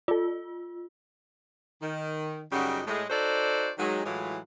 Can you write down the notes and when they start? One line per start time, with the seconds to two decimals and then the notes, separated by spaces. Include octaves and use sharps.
0.08 F4 A4 D5
1.82 D#3
2.52 F#2 C#3 G3 D#4 F#4
2.87 A2 G#3
3.10 D#4 F#4 A4 C5 D5
3.78 D#3 F#3 G#3
4.05 A2 E3 F#3 G#3 E4 F4